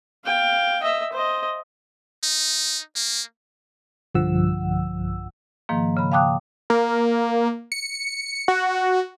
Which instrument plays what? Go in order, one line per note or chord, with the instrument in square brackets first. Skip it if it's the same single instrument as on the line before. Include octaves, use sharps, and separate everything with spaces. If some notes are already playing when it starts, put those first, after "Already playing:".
[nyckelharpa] F5 G5
D#5 E5
C5 D#5
[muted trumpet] D#4
A#3
[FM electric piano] B1 G2 D3 F3 F#5 E6
[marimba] G#2 D#3 F3 A#3
C#3 B5
F5 G5 A5 D6 D#6 F#6
[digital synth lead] A#3
C#7
F#4